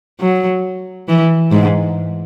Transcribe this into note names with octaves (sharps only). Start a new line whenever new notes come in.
F#3
E3
G#2